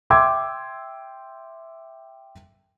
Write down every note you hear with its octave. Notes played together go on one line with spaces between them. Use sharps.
E5 G5 C6 D6 E6 G#6